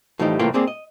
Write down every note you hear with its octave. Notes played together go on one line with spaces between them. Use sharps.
A2 E3 F3 G3 D#4 G4
C2 A2 E3 A#3 F4 G5
G3 A#3 C4 G4 G#4 D5
D#5